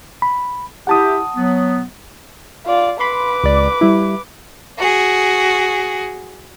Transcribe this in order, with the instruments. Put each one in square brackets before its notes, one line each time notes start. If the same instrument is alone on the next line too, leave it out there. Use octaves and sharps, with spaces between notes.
[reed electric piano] B5
[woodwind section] E4 G4 [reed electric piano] F#5 A5 D#6
[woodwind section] F#3 B3
[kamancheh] F4 D5
[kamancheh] B4 D6 [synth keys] B5 C6
[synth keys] C#2 D5
G3 E4
[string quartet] F#4 G#4